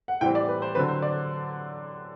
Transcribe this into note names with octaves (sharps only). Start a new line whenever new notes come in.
F#5
A2 E3 G3 C4 G5
D5
B4
C5
D3 F#3 C4 B4
C5
D5